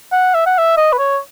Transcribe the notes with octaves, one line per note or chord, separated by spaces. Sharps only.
F#5
E5
F#5
E5
D#5
B4
C#5